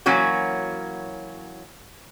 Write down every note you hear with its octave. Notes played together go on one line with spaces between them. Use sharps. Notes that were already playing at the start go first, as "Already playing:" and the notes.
E3 F#3 A#3 C#4 F#4